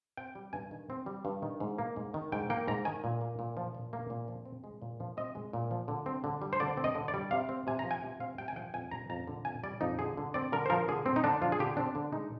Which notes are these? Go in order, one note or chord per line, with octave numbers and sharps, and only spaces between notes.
C4 G5
G3
G2 G#5
D#3
C4
G3
G2
D#3
G#2
A#3
G#2
D#3
G#2 G5
A#3 G5
G#2 A#5
D#3 G#5
A#2
A#3
A#2
F3
A#2
A#3
A#2
F3
C4
G#3
A#2
F3
C4 D#5
G#3
A#2
F3
D3
C4
D3
G3
C5
D3 D5
C4
D#5
D3
D5
G3
C3 F5
C4
C3 G#5
A#5
F3
G#5
C3
C4 F5
C3 G5
G#5
F3 G5
F2 G#5
G3 A#5
F2 A#5
D3
F2 G#5
G3 D5
F2 D#4
D3 G#4
D3
C4 D5
D3 A#4
C5
F3 A#4
D3 G#4
C4
D#4
D3 D4
F3 F4
G#4
D3 G4
C4 D4
D3
G#3 D#4